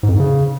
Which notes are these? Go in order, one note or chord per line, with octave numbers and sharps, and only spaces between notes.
G#2
F2
G#2
C#3